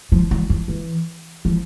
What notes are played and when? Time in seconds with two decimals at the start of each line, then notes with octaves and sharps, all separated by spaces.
0.12 F3
0.31 F#3
0.50 F3
0.68 E3
1.45 F3